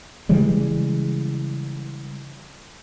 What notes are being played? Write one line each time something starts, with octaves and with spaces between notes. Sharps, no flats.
C#3 E3 G3 G#3